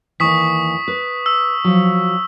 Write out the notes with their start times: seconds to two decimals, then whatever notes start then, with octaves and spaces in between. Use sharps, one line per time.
0.20 D#2 E3 C#6 D#6 B6
0.88 B4
1.26 E6
1.64 F3 F#3